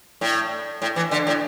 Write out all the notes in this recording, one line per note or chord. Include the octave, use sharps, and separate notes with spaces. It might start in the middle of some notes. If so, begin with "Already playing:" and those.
A2
A2
E3
D3
A2